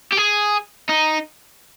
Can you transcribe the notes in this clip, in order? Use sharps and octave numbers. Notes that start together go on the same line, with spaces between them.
G4
G#4
D#4